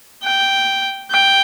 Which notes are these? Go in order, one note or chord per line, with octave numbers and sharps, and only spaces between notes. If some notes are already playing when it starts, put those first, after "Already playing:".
G5
G5